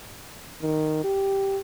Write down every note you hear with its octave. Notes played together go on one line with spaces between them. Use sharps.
D#3
G4